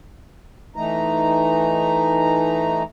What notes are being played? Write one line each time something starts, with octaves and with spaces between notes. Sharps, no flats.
E3 A3 D#4 A#5